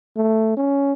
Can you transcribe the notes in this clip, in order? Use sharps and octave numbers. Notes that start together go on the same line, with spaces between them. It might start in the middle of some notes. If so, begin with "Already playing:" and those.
A3
C#4